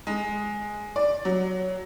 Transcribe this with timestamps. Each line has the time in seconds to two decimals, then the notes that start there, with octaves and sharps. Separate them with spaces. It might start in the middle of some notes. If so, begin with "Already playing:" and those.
0.07 G#3
0.96 D5
1.25 F#3